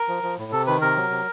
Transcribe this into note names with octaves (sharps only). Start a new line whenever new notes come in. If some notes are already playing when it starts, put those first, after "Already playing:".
Already playing: A#4
F3
F3
A2
C3 A4
D#3 B4
C3 A#4
F#3
C3